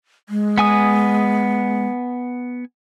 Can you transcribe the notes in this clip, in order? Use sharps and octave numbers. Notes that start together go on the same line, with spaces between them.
G#3
B3 G#5 D#6